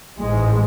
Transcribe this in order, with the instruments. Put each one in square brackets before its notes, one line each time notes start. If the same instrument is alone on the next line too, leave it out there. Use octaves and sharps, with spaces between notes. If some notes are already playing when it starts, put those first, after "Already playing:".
[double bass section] A1 G#2 G#3